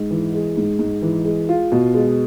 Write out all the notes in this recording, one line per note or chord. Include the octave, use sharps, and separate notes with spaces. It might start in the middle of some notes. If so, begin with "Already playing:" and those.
Already playing: G#2
E3
G#3
G#2
G#2
E3
G#3
F4
B2
G#3